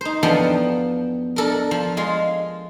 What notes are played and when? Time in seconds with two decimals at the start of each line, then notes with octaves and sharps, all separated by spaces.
0.01 D#4 C5
0.23 E2 F3 B3 D4 A4 G5
1.36 D4 A4 A#4
1.71 F3
1.97 G#3 F4